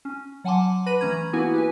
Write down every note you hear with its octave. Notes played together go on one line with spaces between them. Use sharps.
C#4
F#3 F#5 G#5 A5 C6 D6
B4 B5 A#6 D#7 F#7
E3 A3 C#4 A#5 G#6
A#3 B3 E4 F#4 B4 G#5
G4 B4 G#5